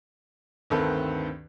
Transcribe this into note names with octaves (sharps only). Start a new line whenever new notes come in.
D2 G2 D#3 C4 A4 B4